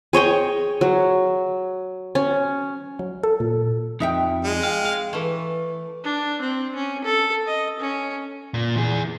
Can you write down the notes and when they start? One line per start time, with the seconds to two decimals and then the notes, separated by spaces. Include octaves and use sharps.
0.13 G#4 C#5 D#5 G5
0.81 F#3
2.15 C#4
2.99 F#3
3.23 A4
3.40 A#2
4.00 F2 D#4 E5 G5
4.44 G#3
4.63 F5 G5
4.85 F5
5.13 E3 A3
6.04 D4
6.42 C4
6.75 C#4
7.04 A4
7.46 D#5
7.80 C#4
8.54 A#2
8.76 E3 G#4